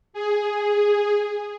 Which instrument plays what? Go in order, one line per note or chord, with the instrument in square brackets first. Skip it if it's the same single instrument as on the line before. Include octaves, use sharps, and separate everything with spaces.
[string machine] G#4